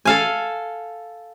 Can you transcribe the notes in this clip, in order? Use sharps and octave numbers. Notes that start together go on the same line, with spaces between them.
A4 F5 G#5